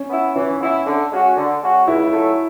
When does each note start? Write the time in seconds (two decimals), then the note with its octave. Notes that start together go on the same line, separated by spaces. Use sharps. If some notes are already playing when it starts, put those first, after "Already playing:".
Already playing: C#4
0.09 B3 E4
0.35 E3 C#4
0.60 B3 E4
0.86 D3
1.12 G#3 C#4 F#4
1.36 D3
1.62 G#3 C#4 F#4
1.87 C#2 E4
2.13 C#3 F#3 A3